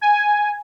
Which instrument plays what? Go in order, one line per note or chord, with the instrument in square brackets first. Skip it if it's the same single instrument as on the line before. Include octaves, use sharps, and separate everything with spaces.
[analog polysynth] G#5